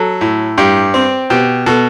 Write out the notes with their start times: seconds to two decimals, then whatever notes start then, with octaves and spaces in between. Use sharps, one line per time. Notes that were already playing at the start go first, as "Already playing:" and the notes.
Already playing: F#3 A4
0.21 A2
0.58 G2 G4
0.94 C4
1.30 B2 G4
1.66 B2 A4